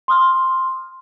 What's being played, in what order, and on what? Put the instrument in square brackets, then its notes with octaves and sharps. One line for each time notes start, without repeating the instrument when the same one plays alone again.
[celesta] C6 D#6 F6